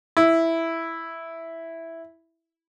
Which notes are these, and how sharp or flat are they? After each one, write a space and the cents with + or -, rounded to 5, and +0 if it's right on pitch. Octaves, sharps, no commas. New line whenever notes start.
E4 +0